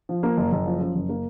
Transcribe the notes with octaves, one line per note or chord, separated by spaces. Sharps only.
F3
A#3
F#1
F#1
F3
F#2
F#1
A#3